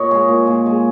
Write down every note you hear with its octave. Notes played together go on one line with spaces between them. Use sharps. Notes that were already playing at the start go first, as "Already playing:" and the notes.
Already playing: A#2 C#5 D#5
G#3 G#4
A#2
A#2
G#3